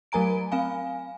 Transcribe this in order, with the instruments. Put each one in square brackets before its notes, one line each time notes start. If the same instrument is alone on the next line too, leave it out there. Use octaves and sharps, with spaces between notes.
[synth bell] F#3 A3 A#4 G#5 A#5 D7
C4 F5 G#5